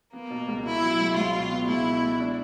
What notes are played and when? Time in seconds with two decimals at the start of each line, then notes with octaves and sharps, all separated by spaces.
0.13 A#3 B3
0.30 B2
0.48 C#2
0.65 B2 E4
0.82 F#3
0.99 C#2
1.16 C#2 F4
1.33 B2
1.51 B3
1.68 C#2 E4
1.85 B2
2.02 C#2
2.19 D4